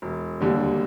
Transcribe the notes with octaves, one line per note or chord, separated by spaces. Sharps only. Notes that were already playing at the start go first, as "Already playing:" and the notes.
E1
D#2 D3 G3